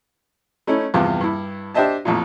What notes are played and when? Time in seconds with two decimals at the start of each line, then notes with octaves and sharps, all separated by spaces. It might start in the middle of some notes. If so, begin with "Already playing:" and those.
0.67 A3 C#4 D#4 E4
0.94 E2 G2 C3 F3 F4 G5
1.21 G2 E4
1.74 D4 G4 C5 D#5 E5 A5
2.05 A1 F2 A#2